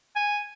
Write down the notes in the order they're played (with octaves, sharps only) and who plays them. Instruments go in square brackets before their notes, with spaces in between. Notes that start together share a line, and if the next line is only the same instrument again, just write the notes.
[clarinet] G#5